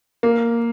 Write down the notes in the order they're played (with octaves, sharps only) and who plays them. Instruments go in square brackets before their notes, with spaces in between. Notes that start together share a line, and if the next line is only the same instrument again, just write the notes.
[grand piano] A#3